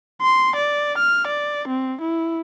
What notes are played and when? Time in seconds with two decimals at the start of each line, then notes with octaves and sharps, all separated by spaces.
0.22 C6
0.56 D5
0.98 F6
1.27 D5
1.68 C4
2.01 E4